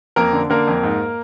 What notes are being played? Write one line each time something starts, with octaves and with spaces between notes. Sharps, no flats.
F2 A#3 A#4
D3
D3 A#3 A#4
F2
G#2